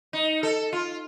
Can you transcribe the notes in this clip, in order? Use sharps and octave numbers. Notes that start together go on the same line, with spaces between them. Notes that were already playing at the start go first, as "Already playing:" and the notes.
D#4
A4
F4